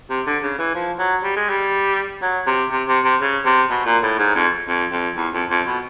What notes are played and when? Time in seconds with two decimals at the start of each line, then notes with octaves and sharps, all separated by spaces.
0.10 C3
0.26 D3
0.43 C#3
0.59 E3
0.75 F3
0.99 F#3
1.23 G3
1.36 G#3
1.49 G3
2.22 F#3
2.47 C3
2.71 C3
2.88 C3
3.04 C3
3.21 C#3
3.45 C3
3.70 B2
3.86 A#2
4.03 A2
4.19 G#2
4.35 F2
4.68 F2
4.92 F2
5.16 E2
5.33 F2
5.50 F2
5.67 B2